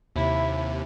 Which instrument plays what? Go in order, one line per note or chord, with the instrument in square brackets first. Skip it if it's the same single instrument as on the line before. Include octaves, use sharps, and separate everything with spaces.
[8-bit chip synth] D#2 C3 [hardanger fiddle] E4